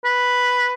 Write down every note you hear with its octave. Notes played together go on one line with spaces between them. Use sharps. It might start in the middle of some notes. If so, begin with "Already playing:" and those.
B4